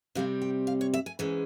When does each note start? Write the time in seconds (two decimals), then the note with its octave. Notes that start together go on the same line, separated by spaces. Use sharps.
0.15 C3 G3 C4 F5
0.42 G5
0.67 F5
0.81 C#5
0.94 E5
1.06 G#5
1.19 G#2 E3 G#3 C#4